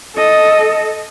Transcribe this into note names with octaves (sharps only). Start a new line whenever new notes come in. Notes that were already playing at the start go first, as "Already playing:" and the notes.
A4 D#5